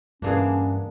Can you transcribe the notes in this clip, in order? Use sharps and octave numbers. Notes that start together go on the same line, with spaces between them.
D2 G2 E3 A#3 B3 C#4 D4 G#4